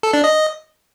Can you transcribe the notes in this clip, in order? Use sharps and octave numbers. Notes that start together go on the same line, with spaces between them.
A4
D4
D#5